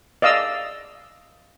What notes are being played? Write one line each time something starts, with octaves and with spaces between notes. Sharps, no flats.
D5 D#5 F5 E6